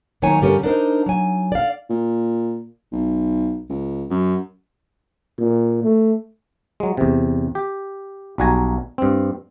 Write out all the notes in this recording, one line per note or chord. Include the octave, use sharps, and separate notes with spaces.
D#2 D#3 F#3 C#5 G#5 A#5
G2 D3 C#4 G4 A#4 G#5
D4 D#4 A#4 C5
F#3 G#5
D5 F5
A#2
B1
C#2
F#2
A#2
A3
F#3 G#3
E2 C3
G4
B1 G3 F#4 G#5 A#5
G2 C4